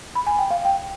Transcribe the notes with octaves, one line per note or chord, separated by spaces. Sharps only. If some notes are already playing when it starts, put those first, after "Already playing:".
B5
G#5
G5
F5
G5